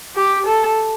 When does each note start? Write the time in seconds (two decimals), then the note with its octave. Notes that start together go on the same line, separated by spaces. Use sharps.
0.16 G4
0.47 A4